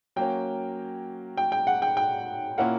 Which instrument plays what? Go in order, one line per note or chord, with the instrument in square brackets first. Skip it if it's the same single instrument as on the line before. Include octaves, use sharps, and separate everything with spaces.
[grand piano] F#3 A#3 C#4 [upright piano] G5
[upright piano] G5
G5
F#5
G5
G5
[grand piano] A#2 A#3 C#4 E4 A#4 [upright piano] F#5